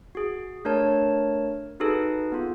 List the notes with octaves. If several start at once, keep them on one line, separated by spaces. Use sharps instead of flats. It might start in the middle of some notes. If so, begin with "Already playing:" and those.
F#4 G#4
A3 D4 A#4 C#5 A5
D#4 F#4 G#4 A4 B4
B3 F4